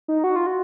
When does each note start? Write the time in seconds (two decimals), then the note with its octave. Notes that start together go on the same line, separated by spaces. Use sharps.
0.08 D#4
0.24 F#4
0.36 F4
0.46 F#4